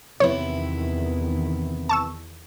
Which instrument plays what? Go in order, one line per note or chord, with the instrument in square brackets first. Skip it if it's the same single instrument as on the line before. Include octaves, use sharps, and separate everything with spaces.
[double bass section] E2 D#3 E3 [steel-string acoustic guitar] C3 B3 E4 [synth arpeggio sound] C#5
[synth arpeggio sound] A5 C#6 E6